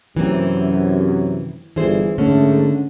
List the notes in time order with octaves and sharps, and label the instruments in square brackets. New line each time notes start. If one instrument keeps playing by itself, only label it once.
[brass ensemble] F#2 C3 [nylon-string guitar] E3 A#3 C4
[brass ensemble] G1 [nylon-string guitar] E3 G#4 C5
[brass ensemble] G#2 A3 [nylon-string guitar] D3 C#4